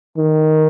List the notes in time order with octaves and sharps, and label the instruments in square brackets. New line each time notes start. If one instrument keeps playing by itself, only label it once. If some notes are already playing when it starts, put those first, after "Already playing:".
[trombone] D#3